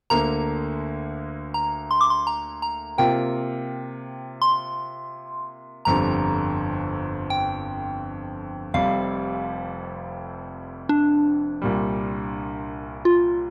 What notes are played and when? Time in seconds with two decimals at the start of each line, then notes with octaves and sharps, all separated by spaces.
0.10 D2 D3 A#3 A#5
1.54 A#5
1.91 C6
2.01 D6
2.10 C6
2.27 A#5
2.62 A#5
2.98 C3 A#3 F4 G5
4.42 C6
5.85 G1 F2 D3 G3 A#5
7.30 G5
8.74 F1 F2 C3 G3 F5
10.89 D4
11.62 C2 A#2 G3
13.05 F4